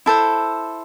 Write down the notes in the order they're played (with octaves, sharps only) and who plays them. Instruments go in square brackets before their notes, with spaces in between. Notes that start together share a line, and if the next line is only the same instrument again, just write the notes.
[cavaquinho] E4 A4 C5